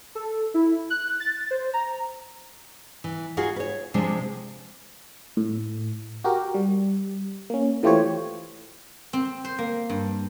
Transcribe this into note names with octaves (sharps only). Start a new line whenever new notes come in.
A4
E4
F#6
A6
C5
A#5
E3
D#4 F4 F#4 G#4
B4 C#5
C3 F3 G#3 D4
A2
F#4 G4 A#4
G3
A#3 C#4
E3 A3 F4 G4 C5 C#5
C4
C5
A#3
G2